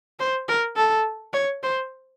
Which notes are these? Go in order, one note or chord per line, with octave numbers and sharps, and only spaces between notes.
C5
A#4
A4
C#5
C5